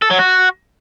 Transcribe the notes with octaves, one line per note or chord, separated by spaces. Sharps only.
A4
F#3
F#4